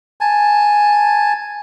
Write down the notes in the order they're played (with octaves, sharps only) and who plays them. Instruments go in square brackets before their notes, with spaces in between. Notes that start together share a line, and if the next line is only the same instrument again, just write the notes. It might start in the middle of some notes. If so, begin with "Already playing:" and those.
[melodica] G#5 A5